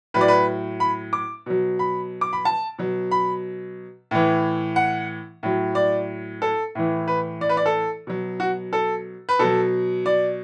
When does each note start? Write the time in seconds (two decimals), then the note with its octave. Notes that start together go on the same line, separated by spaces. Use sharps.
0.14 A2 F#3 B4
0.21 D5
0.28 B4
0.80 B5
1.13 D6
1.46 B2 F#3
1.79 B5
2.21 D6
2.33 B5
2.45 A5
2.78 B2 F#3
3.11 B5
4.11 A2 E3
4.76 F#5
5.43 A2 F#3
5.75 D5
6.42 A4
6.75 A2 E3
7.08 B4
7.41 D5
7.49 B4
7.57 D5
7.66 A4
8.07 B2 F#3
8.40 F#4
8.73 A4
9.29 B4
9.39 B2 F#3 A4
10.06 D5